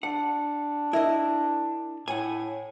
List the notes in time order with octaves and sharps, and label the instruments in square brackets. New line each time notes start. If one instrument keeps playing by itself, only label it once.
[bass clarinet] D4 [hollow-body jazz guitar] F#5
[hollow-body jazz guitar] E4 A#4 D#5
[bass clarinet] A2 [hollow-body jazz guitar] F#5 G#5